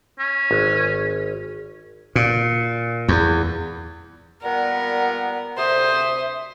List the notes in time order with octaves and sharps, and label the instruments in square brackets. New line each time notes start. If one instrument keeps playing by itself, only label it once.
[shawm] C#4
[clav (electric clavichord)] G#1
[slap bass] A#2
E2
[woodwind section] A#2 G3 B3 [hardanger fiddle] A#4 [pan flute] F#5
[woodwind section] D2 C3 D#6 [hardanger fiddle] C5 [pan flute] E5